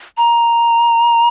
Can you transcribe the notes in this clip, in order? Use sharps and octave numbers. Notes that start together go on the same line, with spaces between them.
A#5